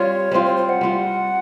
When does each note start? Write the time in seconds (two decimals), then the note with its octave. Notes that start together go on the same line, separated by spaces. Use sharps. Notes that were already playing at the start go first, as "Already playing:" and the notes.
Already playing: G3 C4 F4 C#5
0.32 G3 C4 F4 C5
0.45 C5
0.56 C5
0.69 F#5
0.81 G3 C4 F4